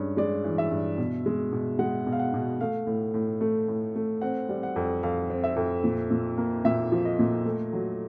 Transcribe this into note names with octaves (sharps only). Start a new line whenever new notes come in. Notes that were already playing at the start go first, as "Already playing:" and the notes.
Already playing: G2 G#3 C#4
G#3 D5
E3
E5
G2
B2
G#3
B2
G#3 F#5
B2
F5
F#5
B2
A3 F5
A2
A2
A3
A2
A3
C4 F#5
G3
F#5
F2
F2 F5
C4
E5
F2
A#2
A#2
A#3
A#2 E5
F3
D#5
A#2
A3
F#3